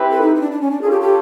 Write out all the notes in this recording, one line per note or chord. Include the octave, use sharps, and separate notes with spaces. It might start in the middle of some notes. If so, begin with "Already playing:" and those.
Already playing: C4 E4 G4 B4
A4
D#4
D#4
D4
D4
C#4
D4
C#4 F4 G#4 A4
G4
G4